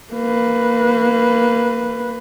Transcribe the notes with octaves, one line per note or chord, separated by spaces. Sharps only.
A#3 B4